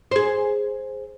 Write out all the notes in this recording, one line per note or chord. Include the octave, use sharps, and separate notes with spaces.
G#4 C5